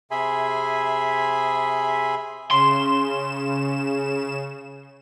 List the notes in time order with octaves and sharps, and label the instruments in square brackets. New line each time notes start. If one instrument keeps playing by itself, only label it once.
[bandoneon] C3 G#4 E5 G#5 B5 C6
[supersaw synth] C#3 E7 [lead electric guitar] C6